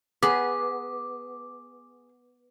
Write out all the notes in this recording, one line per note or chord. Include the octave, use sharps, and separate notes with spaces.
B3 G#4 D6